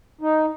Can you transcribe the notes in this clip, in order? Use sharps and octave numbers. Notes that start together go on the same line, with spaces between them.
D#4